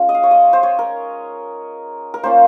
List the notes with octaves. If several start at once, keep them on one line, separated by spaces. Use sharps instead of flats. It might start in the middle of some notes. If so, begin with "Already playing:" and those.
Already playing: G#3 C#4 F4
D#5
F5
C#5
D#5
C5
C#5
A#4
A#4
A#3 C#4 F4 C5